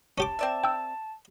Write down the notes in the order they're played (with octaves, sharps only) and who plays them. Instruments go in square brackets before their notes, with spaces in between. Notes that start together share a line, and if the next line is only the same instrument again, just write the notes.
[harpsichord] C#4 G4 D6 [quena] A5
[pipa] C4 D5 E5
[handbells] G5 E6